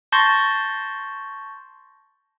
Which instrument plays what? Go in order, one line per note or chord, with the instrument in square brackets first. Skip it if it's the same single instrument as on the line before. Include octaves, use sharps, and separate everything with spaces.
[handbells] A5 C6 C#6 G6 A6 A#6